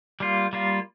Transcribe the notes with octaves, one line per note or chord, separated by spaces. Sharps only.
G3 A#3 F4
G3 A#3 F4